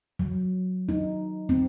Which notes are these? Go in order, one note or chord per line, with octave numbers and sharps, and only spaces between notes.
F#3
D#4
C4